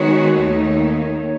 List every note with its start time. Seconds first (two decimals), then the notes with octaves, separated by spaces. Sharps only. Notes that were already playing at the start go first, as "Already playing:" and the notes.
Already playing: D#3 G#3 B3 F#4 C#5
0.34 D#2 D#3 A3 D#4